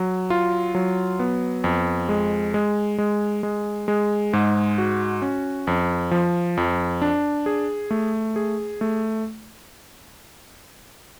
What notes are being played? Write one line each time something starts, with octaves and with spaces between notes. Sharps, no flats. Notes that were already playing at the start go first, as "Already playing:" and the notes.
Already playing: F#3
F4
F#3
B3
F2
G#3
G#3
G#3
G#3
G#3
G#2
F#4
C#4
F2
F3
F2
D4
G#4
A3
G#4
A3